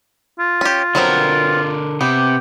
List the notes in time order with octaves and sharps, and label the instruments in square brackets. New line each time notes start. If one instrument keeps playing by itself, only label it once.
[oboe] F4
[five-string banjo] C#4 G4
[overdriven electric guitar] D3 A#4 [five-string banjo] F#3 B3 C4
[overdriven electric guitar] C3 [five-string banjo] B3 [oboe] G4